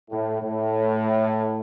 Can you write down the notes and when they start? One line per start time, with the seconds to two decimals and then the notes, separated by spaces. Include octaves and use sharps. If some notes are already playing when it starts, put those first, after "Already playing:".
0.11 A2
0.42 A2